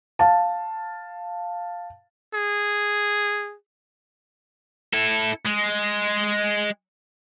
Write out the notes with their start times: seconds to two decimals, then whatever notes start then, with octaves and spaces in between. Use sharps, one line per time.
0.19 F5 A5
2.34 G#4
4.93 E4 A4
5.46 G#3